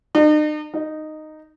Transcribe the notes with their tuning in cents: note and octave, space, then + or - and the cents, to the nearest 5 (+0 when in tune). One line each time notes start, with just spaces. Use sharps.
D#4 -45
D#4 -10